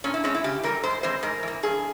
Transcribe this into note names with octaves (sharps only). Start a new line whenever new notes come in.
A#2 C#4
E4
G#3 C4 C#4
E4
C#3 G4
E3 G3 A#4
G#2 C5
E3 G#3 C4 C5
G#2 A#4
E3 A#3
G2 G#4